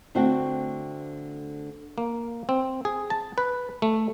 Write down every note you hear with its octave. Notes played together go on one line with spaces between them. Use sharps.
D3 A3 C4 F#4
A#3
C4
G#4
A5
B4
A3